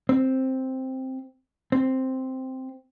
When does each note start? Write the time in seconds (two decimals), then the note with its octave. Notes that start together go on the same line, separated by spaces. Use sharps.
0.09 C4
1.72 C4